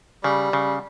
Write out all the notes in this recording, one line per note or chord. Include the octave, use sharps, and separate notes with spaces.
C#3 G3
C#3